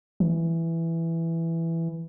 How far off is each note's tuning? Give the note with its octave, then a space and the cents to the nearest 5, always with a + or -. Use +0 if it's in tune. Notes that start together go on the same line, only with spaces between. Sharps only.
E3 +5